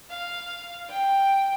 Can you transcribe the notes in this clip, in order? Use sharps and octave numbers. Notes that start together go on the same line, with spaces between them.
F5
G5